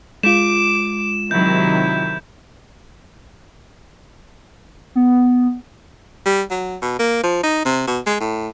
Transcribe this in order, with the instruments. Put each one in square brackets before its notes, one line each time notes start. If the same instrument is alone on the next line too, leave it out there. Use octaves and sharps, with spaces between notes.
[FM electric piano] G#3 F4 [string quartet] D6 [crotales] E7
[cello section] C3 D#3 F#3 [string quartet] E4 [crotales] G6
[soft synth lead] B3
[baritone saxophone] G3
F#3
B2
A#3
F3
D#4
C3
B2
G#3
A2